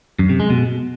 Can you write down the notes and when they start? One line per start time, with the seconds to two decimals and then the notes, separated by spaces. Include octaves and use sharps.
0.19 F#2
0.29 C3
0.40 G#3
0.50 B2